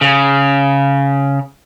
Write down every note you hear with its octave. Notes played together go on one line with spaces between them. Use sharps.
C#3